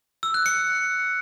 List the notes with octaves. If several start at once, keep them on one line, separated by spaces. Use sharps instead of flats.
E6
F#6
C#7